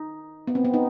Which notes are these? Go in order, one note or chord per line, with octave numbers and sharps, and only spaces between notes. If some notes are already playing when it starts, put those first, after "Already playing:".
Already playing: D#4
B3
C4
B3
D#4